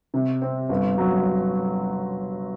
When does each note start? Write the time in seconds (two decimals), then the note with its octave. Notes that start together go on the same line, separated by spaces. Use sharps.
0.14 C3
0.42 C4
0.69 G1
0.98 F#3